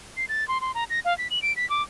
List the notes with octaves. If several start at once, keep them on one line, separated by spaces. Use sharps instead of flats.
C7
A6
C6
C6
A#5
A#6
F5
B6
F#7
D7
B6
D6